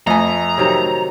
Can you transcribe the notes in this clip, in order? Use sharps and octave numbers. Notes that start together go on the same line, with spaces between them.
F2 A3 G#5 A#5
C3 D#3 F#3